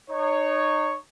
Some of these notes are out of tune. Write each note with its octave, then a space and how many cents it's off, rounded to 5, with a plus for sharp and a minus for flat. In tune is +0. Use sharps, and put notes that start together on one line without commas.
D#4 -30 C#5 +0